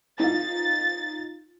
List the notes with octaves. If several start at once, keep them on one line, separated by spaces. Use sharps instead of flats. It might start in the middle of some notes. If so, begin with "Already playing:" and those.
D#4 F4 A6